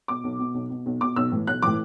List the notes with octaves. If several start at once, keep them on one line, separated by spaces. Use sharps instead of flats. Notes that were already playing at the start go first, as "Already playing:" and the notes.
B2 D6
B1
B2
B1
B2
B1
B2 D6
B1 E6
A2 E3
B1 F#6
A2 E3 D6